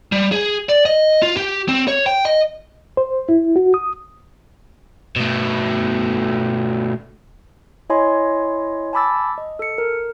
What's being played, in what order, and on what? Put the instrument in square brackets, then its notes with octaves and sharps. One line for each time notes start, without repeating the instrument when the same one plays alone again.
[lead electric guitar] G3
G#4
D5
D#5
F4
G4
C4
C#5
G5
D#5
[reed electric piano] C5
E4
F#4
D#6
[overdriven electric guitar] B2 A3
[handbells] E4 C#5 D#5 G#5 C6
G#5 A5 B5 D6 E6 A6
D#5
A4 C#7
A#4